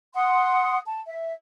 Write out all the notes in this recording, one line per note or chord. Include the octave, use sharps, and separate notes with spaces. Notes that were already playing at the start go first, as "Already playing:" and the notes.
F#5 C6 D#6
A5
E5